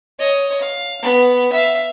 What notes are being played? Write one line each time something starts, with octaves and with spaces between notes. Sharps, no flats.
C#5 D#5
F5
B3
E5 F5